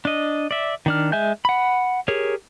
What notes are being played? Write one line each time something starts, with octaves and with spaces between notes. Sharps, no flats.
D4 D#5
D5 E5
D#3 D4 F6
G#3 E5 G#5 G6
F#5 B5
G4 G#4 A#4 C#5